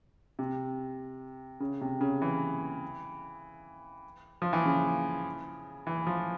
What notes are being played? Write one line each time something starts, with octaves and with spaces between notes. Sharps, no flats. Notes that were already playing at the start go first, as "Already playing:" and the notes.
C3
C#3
C3
C#3
E3
F3
E3
C#3
E3
F3